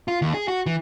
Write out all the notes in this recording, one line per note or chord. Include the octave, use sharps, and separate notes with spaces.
F4
D#2
G#4
F#4
E3